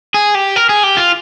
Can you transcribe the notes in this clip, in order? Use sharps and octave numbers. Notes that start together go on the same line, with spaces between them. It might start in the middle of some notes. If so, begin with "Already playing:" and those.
G#4
G4
A#4
G#4
G4
F4